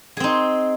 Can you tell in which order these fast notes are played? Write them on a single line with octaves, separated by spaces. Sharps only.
G#4 C4 D#4